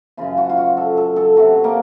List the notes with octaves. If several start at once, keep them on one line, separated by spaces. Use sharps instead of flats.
F#2 C#3 F3 F4
F#4
F4
F#4
A4
A4
A4
C3 F#3 F#4
A#3